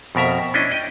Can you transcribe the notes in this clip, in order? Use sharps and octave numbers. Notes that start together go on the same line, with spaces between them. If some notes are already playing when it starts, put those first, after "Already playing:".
F2 B2 A#4 E5 A#5
C#4 D4 E4 D#5
D#5 G5